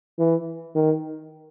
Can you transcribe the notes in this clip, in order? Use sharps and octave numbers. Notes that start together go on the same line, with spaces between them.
E3
D#3